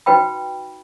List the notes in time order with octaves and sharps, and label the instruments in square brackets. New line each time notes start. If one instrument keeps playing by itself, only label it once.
[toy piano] D#4 F#4 B4 G5 B5